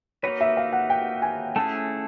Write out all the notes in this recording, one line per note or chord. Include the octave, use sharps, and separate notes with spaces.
A#3 D#4 F#4 B4 C#5
E5
F5
F#5
G5
G#5
A3 C#4 E4 G#4 A5